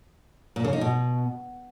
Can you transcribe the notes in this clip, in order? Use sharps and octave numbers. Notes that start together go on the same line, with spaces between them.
A#2
C#3
D#4
B2